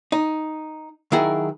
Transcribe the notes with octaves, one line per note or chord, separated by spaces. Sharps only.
D#4
D#3 F#3 E4 G#4 A#4